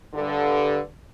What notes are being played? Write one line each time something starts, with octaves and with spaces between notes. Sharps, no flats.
G2 D3